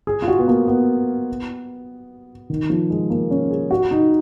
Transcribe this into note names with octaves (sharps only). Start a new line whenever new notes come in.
G#4
F4
F#4
B3
A#3
B3
D#3
F3
G#3
A#3
C#4
G#4
F#4
D#4